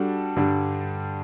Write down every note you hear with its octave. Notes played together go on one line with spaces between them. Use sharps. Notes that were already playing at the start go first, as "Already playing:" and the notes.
Already playing: G3 D4 F#4 A4
G2 D3 G3 D4